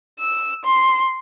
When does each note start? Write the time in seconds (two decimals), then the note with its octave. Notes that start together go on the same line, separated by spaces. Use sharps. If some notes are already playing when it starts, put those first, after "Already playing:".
0.20 E6
0.65 C6